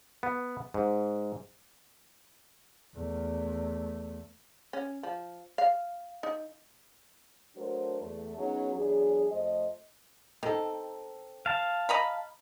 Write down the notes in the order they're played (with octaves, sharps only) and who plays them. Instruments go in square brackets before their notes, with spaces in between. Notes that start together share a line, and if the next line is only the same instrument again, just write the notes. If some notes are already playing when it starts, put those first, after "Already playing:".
[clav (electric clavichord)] B3
G#2
[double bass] E2 A3
[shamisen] C#4
F3
F5
D#4
[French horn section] F#3 A3 D4 F#4 A#4 C5
E2 A3
F#3 B3 C#4 D#4 F#4 G#4
E2 F#3 D4 G#4
F2 A3 C5 D#5
[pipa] D#3 [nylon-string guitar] C4 A4
[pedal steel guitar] F5 A5
[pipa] D#5 A#5 B5